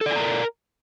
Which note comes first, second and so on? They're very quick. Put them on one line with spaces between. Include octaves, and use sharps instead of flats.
A4 D5 G#5 A#5 A#4